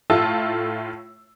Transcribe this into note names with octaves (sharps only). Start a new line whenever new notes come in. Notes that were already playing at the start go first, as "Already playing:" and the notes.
A2 A3 F4 A5 E6